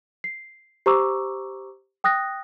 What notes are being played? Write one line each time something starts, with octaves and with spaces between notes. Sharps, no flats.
C7
G4 C5 A#5 C#6 D6 E6
G5 D#6 F#6 A#6